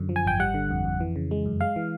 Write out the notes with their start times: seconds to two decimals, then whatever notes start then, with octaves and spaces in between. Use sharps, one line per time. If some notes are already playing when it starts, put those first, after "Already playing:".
Already playing: F#2 D3
0.09 F3
0.16 G#5
0.25 G#1 G5
0.39 G3 F#5
0.54 D3
0.71 F2
0.85 F2
1.00 E3
1.16 C#3
1.31 G#3
1.46 F#2
1.61 G#3 F5
1.76 E3